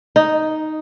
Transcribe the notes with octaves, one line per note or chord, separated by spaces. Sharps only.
D#4